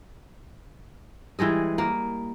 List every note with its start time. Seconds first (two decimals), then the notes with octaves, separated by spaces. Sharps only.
1.39 E3 G3 G#3 D#5
1.78 A#3